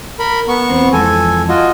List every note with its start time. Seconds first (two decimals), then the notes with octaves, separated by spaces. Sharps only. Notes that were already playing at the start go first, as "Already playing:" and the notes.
0.19 A#4 B5
0.48 B3 C#6
0.70 E2 C4
0.93 F2 E3 G#3 A4 G#5
1.49 F4 F#4 D#5